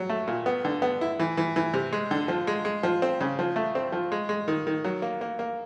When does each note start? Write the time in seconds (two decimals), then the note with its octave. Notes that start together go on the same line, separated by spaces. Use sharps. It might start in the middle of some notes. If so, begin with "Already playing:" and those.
Already playing: F#3
0.09 A3
0.28 A#2
0.46 B3
0.65 D3
0.82 B3
1.01 E4
1.20 E3
1.37 E3
1.56 E3
1.74 C3
1.93 G#3
2.11 D3
2.28 F3
2.47 G#3
2.65 G#3
2.83 F3
3.02 C4
3.21 C#3
3.39 F3
3.56 A3
3.75 C4
3.92 F3
4.12 G#3
4.29 G#3
4.48 D#3
4.67 D#3
4.84 F#3
5.02 A#3
5.21 A#3
5.39 A#3